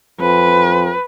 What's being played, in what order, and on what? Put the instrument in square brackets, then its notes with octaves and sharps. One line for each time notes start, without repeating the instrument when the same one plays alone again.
[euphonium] F2 [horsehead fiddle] B4